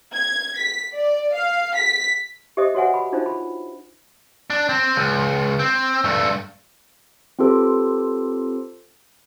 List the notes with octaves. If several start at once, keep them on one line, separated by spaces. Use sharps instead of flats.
G#6
B6
D5
F5
B6
G4 C5 D#5 E5 D#6
F#4 B4 C#5 E5 F#5 G#5
B5
D4 D#4 F4 C5
B5
D4
C4
C#2
C4
G2 A3
C4 F4 G4 A4 B4 C5